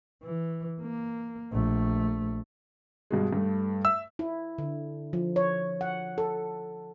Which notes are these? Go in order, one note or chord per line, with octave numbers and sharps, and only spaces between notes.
E3
A#3
A#1 A3
G2 B2 G#3
G2 A3
E5 E6
E4
D3
F3
C#5
F#5
A4